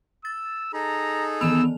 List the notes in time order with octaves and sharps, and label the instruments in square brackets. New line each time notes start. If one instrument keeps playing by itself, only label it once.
[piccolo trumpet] E6 [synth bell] A6
[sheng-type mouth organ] D#4 G#4 A4 [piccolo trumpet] A#5
[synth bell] D#3 E3 F7 [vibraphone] B3 [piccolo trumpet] E6